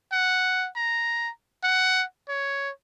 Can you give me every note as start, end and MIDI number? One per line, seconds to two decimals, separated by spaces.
0.12 0.67 78
0.76 1.30 82
1.63 2.03 78
2.29 2.70 73